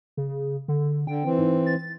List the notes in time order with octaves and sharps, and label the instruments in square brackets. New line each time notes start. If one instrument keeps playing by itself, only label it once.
[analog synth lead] C#3
D3
[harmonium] D3 [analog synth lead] G5
[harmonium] E3 C4
[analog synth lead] G#2
A6